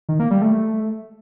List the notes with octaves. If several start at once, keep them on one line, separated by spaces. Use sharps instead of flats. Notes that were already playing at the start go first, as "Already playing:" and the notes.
D#3
A#3
G3
A3